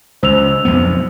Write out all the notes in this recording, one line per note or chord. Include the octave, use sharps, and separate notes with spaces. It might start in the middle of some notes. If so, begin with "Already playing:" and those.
C#2 C5 E6 F7
B1 F2 B3